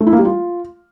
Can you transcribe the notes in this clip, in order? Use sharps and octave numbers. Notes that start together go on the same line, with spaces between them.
A3
E4
A#3
G3
F4